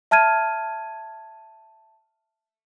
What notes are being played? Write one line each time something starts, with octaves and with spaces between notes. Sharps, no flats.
E5 A5 F6 G#6 D#7